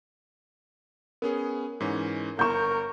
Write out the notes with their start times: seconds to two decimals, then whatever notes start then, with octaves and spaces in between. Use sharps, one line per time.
1.22 B3 C#4 G#4 A#4
1.80 G#2 E3 C#4
2.39 G1 A#4 C#6 G6 E7